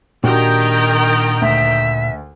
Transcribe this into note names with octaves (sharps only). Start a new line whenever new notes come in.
A#2 D#3 D4 F#4 G4 G5 A#5
D2 E5